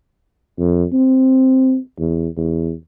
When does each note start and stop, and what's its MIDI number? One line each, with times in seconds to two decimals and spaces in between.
0.59 0.84 41
0.93 1.77 60
1.99 2.28 40
2.37 2.73 40